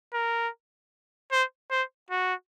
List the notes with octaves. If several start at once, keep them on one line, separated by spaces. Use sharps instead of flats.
A#4
C5
C5
F#4